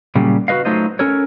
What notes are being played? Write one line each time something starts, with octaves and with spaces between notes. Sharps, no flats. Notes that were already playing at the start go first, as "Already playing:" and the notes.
A#2 C#3 F#3 G3
F#4 G4 B4 D#5 F5
F#3 A3 D#4 F4 C5 D#5
C#4 A4 A#4 C#5